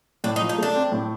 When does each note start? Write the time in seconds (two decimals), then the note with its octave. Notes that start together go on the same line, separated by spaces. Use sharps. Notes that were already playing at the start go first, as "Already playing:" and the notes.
0.24 A2 D4
0.36 D#4
0.41 F3
0.49 D#4
0.58 A3 D4
0.75 C4
0.92 A2